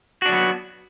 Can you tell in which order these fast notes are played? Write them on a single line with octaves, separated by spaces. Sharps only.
F#4 D4 F#3 B3